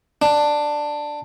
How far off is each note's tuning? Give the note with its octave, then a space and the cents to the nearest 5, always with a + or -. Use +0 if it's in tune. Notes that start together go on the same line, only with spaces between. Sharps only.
D4 +10